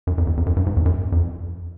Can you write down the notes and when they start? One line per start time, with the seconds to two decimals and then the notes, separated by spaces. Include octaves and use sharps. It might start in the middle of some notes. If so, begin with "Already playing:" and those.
0.07 F#2
0.18 F2
0.27 E2
0.37 F2
0.46 F#2
0.56 G2
0.66 G#2
0.77 E2
0.86 F#2
1.12 F2